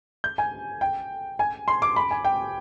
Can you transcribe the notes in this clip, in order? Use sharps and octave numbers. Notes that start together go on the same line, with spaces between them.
G6
G#5
G5
G#5
C6
D6
B5
G#5
G5